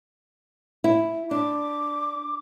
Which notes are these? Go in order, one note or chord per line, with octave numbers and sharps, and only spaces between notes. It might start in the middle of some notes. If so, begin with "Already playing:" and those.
E4
D4 D6